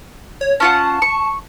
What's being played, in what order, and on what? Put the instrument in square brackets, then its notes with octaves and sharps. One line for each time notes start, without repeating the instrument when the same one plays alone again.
[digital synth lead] C#5
[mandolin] C#4 F4 F#5 [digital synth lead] A5
[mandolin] C#6